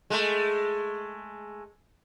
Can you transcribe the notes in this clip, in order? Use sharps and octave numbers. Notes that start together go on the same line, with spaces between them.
G#3 A3